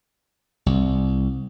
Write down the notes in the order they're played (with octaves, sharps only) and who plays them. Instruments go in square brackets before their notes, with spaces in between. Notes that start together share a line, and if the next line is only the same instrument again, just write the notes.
[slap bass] C2